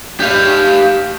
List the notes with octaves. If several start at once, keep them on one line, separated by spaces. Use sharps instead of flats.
G4 F5